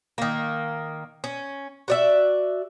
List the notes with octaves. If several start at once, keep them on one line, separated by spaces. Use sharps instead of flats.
D#3 A#3
C#4
F#4 D5 E5